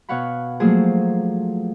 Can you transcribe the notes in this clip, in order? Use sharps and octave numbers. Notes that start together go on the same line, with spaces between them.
B2 C#5 F5 F#5 B5
F3 F#3 A3 A#3 G#4 C5